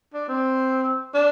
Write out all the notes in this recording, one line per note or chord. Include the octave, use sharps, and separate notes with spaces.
D4
C4
D4